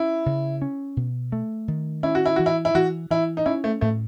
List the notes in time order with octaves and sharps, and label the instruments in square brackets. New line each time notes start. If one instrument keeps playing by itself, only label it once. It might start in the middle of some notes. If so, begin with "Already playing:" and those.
Already playing: [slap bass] C#4 [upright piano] E4
[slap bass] C#3
C#4
B2
A3
D#3
[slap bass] C#4 [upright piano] E4
[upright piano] F#4
E4
[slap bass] E3 [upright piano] F#4
[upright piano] E4
E4
[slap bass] E3 [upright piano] F#4
[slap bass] E3 [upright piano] E4
[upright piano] D#4
[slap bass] C#4 [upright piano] E4
[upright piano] A3
[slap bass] A2 [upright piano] A3